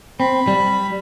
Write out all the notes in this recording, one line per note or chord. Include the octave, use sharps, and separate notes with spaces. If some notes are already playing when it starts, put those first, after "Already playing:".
C4 B5
G3